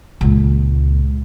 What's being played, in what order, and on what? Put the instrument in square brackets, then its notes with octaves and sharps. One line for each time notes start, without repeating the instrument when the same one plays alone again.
[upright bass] C#2 A#2